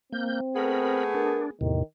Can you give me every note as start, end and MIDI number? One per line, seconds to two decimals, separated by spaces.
0.12 0.40 58
0.12 1.05 60
0.12 0.40 91
0.56 1.52 57
0.56 1.52 59
0.56 1.52 68
0.56 1.04 70
0.56 1.04 83
1.14 1.50 62
1.14 1.43 70
1.61 1.83 40
1.61 1.83 45
1.61 1.83 48
1.61 1.81 51